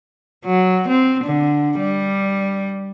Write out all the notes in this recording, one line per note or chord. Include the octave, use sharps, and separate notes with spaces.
F#3
C4
D3
G3